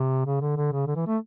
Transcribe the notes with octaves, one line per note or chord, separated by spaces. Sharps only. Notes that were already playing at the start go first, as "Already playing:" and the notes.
Already playing: C3
C#3
D3
D3
C#3
D3
E3
A3